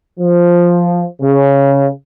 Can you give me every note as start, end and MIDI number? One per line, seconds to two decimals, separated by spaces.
0.19 1.02 53
1.21 1.87 49